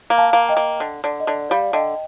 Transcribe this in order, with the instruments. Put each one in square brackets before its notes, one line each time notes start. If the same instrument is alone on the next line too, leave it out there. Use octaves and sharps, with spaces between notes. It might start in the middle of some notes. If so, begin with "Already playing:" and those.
[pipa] A#3
[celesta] F5 A5
[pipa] A#3
[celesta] D#5 G5
[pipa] A#3
D3
[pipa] D3 [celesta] D5
[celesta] D#5
[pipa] D3 [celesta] D5
[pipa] G3 [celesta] D5 F5
[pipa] D3 [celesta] D#5 G5